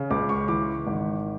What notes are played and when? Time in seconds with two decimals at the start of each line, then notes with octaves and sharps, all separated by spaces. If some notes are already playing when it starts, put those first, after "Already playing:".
Already playing: C#3
0.11 C#2 D6
0.29 C#6
0.48 E3 D6
0.87 G#1